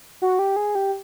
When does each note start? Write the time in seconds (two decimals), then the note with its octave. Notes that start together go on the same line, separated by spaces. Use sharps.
0.22 F#4
0.39 G4
0.56 G#4
0.75 G4